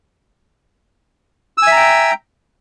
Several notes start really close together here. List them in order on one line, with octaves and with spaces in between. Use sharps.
E6 G#5 E5 A#5 G5